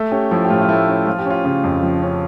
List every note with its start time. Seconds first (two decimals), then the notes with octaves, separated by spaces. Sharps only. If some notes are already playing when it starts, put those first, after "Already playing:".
Already playing: A3 E5
0.12 C#4 G4
0.31 F3 E4
0.45 G4
0.50 A2 F4
0.61 F4
0.69 A3 E4
0.88 C#4
1.06 F3 F4
1.19 G4
1.26 C#4 F4
1.45 C#3
1.64 F2
1.83 F3
2.02 C#4